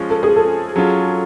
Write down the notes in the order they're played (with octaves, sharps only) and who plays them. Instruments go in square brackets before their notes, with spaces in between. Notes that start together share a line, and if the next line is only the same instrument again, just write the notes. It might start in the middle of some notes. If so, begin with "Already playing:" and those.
Already playing: [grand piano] F3 G#3 C#4 F4
[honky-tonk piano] A4
G#4
A4
[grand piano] F#3 C#4 F4